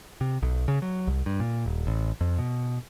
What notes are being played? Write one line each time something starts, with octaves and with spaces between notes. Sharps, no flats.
C3
B1
C#3
F#3
C2
G2
A#2
D#1
A1
F2
B2